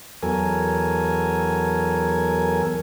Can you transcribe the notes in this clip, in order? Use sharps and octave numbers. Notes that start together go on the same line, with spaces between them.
E2 F#3 A4 A#4 G#5